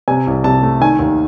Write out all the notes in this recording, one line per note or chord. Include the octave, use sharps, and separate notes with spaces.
C3 G#5
C2
C3 A5
A3
D#3 G#5
D#2